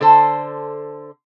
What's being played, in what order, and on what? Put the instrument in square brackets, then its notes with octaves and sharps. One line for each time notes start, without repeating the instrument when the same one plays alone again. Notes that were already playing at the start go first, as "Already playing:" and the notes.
[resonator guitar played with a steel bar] D3 A4 C5